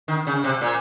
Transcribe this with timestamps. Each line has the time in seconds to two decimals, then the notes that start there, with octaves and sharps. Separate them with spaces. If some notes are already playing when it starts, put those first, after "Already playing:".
0.08 D#3
0.27 C#3
0.44 C3
0.61 A#2